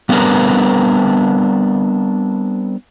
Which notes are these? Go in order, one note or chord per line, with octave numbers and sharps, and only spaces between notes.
G3 B3 C4 D4 A#4 B4